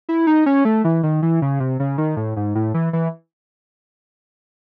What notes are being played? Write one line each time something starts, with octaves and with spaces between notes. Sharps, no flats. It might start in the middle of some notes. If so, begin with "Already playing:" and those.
E4
D#4
C#4
A3
E3
D#3
E3
C#3
C3
C#3
D#3
A2
G#2
A2
E3
E3